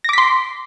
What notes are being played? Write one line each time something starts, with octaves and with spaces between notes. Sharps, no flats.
C6 D6 A#6 B6